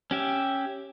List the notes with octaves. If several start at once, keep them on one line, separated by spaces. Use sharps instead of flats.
C#4 G4 E5